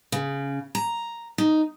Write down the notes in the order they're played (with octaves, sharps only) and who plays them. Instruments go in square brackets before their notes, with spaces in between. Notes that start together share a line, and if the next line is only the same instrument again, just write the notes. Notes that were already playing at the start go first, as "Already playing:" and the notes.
[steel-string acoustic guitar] C#3
A#5
D#4